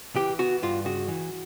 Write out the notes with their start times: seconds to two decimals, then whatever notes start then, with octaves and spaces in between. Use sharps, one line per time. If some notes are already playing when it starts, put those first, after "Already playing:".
0.16 E3 G4
0.39 B3 F#4
0.63 G2 F4
0.85 C#3 F#4
1.08 E3